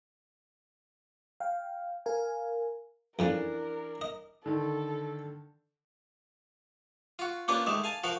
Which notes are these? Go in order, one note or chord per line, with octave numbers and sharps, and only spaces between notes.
F5 G5
A#4 F5 G#5
F2 E3 F3 C#4 D4 A#4
D#5
D3 D#3 A4
F4 F#4
A#3 C#4 D4 F4 G4 B4
D#3 G#3 A3 G4
F5 G#5 A5
F3 F#4 A#4 F5 G5